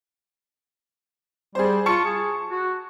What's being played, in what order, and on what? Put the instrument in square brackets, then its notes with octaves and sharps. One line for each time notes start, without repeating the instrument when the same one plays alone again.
[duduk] G3 [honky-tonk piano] G#4 C5
[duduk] F4 [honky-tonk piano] A5 C#6 C#7
[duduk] G#4
F#4